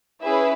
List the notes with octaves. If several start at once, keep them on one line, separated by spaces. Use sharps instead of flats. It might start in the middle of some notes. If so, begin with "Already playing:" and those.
C#4 E4 G#4 B4 E5